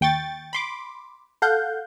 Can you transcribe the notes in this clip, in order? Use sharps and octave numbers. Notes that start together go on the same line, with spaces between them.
D#2 G5 C#6 A6
B5 C6 D6
A4 F5 F#5 G6